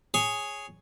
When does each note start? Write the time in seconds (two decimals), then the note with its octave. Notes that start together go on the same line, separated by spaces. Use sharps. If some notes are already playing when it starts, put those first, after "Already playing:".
0.14 G#4 C#5